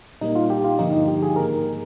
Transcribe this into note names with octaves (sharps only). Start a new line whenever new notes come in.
A#2 G3 A#3 D#4
F4
G4
F4
G2 D3 F3 A#3 D#4
D#4
G4
G#4
G#2 D#3 A#3 A#4